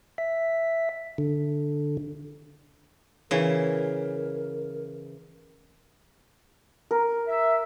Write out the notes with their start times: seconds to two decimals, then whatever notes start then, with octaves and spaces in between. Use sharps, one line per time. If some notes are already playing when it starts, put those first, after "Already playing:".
0.18 E5
1.18 D3
3.31 C#3 E3 A#4
6.91 A#4
7.27 E5